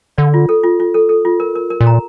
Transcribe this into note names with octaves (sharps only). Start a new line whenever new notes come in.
D3 D5
F4
A4
F4
F4
A4
A4
F4
A#4
A#4
A#4
A#2
A#5